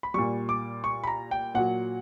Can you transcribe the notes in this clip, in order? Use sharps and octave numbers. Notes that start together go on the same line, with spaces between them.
B5
A#2 G3 C#6
D6
C#6
B5
A#5
G5
A#2 F#3 F#5